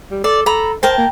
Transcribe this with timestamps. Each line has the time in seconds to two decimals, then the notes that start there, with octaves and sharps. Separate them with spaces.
0.11 G3
0.24 A4 D5
0.46 A4 A#5 B5
0.83 A#4 C5 G5 A5
0.98 A#3